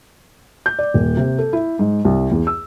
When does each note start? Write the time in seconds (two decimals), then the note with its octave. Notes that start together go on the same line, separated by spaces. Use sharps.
0.66 G6
0.79 D5
0.94 D#1
1.17 C3
1.39 A4
1.53 E4
1.79 G#2
2.05 C2
2.31 E2
2.47 E6